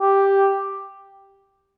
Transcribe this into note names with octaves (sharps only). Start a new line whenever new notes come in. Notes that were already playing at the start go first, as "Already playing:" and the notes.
G4